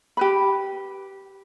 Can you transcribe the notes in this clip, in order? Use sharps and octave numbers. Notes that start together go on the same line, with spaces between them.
G4 B4 B5